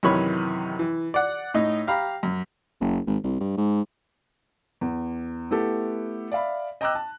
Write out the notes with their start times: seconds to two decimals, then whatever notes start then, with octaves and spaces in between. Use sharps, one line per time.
0.03 F#2 C3 D#3 E3 C#5 B5
0.79 E3
1.14 D5 F#5
1.54 A2 D#4 D#5
1.87 G4 F5 A#5 B5
2.23 F#2
2.80 F#1
3.06 G#1
3.23 C2
3.40 G2
3.57 G#2
4.81 E2
5.51 A3 B3 E4 G4 A4
6.32 D5 E5 F5 B5
6.81 D#5 G5 A#5 D6 E6 F#6
6.95 A5